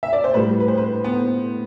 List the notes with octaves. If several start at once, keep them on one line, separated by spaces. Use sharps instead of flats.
E5
D5
C5
A2 G3 B4
B4
C5
B4
B3